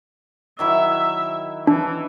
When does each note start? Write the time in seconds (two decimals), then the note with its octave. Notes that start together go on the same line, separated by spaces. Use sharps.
0.59 D#3 F#3 E4 E5
1.67 E3 D4